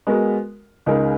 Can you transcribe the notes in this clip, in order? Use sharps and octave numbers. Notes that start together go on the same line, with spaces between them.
G#3 B3 F#4 A#4
C#2 C#3 G#3 D#4 A#4